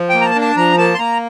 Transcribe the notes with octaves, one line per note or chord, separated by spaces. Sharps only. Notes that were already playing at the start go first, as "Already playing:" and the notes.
Already playing: F3
A#3 G5
A#5
A5
D4
A5
F3 A#5
A#3 A5
C6
A#3 A#5